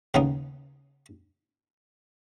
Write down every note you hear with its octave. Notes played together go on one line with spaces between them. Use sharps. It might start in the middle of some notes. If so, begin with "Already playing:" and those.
D#2 C#3 B3 D#4